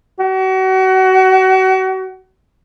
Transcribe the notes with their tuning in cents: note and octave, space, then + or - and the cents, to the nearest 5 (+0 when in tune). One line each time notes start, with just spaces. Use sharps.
F#4 +35